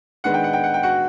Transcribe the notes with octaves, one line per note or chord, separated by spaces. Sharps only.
D#3 G#3 B3 D4 F#5
G5
F#5
G5
F#5
G5
F#4 F#5